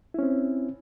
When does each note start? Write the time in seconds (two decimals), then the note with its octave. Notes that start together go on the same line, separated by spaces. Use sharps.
0.14 E4
0.19 C#4
0.23 C4